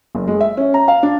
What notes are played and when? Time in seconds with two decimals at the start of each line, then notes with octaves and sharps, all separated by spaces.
0.15 F#1
0.27 G#3
0.40 E5
0.57 C#4
0.74 A#5
0.88 F5
1.03 D4